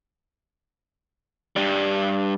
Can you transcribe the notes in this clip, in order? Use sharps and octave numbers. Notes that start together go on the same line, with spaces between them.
G2 G3